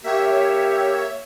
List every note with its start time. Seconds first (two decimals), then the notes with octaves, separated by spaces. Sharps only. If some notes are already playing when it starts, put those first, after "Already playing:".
0.04 A#3 G4 C#5 E5